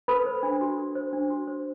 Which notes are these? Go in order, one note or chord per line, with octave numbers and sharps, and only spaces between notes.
A4 B4 B5
C5
D4
F#4
A4
C5
D4
F#4
C5